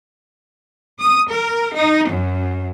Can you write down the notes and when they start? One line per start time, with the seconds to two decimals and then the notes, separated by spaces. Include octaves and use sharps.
1.00 D#6
1.31 A#4
1.74 D#4
2.10 F#2